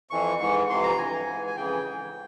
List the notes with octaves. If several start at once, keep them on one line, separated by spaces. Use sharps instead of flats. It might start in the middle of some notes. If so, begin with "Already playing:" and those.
F2 E3 C#6
G#2 E3 C#6
F2 C3 E3 C6
A#5
G2 E3 G#5
G#2 E3
G#5
F2 C#3 E3 G5
G#2 E3